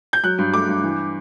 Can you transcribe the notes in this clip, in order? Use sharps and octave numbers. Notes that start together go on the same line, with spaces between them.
G6
F#3 F#6
G2
A3 D6
G2
E3